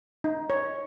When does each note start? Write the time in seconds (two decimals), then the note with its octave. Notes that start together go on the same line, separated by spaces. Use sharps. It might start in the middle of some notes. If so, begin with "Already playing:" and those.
0.24 D#4
0.50 C#5